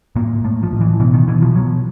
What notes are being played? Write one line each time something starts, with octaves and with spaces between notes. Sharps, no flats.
A2 A#3
A2 A3
F3
A2
E3
B2 E3
D#3
B2 E3
F3
B2 F#3